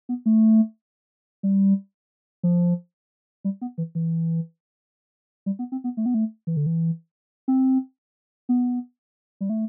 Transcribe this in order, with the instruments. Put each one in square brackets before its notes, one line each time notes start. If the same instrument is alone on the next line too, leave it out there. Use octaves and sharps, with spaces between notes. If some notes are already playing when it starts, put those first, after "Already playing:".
[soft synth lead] B3
A3
G3
F3
G3
B3
E3
E3
G3
B3
C4
B3
A3
B3
A3
E3
D3
E3
C4
B3
G3
A3